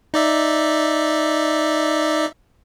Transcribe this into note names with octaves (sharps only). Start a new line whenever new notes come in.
D#4 D5 E5